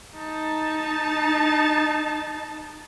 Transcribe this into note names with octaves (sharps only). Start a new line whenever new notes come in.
D#4 A5